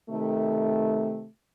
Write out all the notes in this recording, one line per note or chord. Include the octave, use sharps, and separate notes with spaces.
C3 D#3 A3